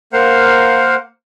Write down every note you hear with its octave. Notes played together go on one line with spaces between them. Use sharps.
A#3 A#4 C5 F5 F#5